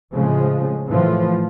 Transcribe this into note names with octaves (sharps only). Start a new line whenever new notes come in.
A2 C#3 F3 G#3
A2 E3 F3